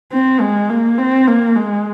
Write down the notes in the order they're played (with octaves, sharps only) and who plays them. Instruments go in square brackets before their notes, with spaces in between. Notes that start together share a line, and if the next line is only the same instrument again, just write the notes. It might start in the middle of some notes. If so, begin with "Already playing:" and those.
[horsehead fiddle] C4
G#3
A#3
C4
A#3
G#3